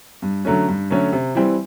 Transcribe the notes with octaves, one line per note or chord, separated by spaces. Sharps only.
G2
D3 F#3 A3 C#4
G2
D3 F#3 A3 C#4
C3
E3 G3 C4